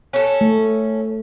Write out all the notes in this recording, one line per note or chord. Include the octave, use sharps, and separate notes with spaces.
C#4 A4
A3